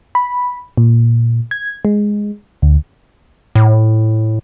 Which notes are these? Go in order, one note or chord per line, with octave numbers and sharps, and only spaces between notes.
B5
A#2
G#6
G#3
D2
A2